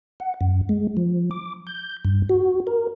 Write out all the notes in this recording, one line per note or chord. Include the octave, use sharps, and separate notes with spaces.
F#5
F#2
G#3
F3
D6
G6
G2
F#4
A#4